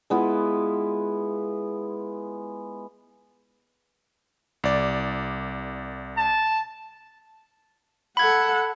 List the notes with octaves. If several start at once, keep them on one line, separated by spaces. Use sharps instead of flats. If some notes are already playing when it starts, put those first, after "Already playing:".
G#3 B3 E4 F4
C2 D5
A5
A4 F#5 B5 G#6